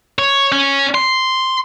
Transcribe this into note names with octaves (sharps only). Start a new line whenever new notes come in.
C#5
C#4
C6